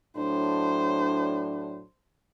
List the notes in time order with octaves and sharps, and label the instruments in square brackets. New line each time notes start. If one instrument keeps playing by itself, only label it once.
[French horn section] A2 F#3 D4 [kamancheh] C5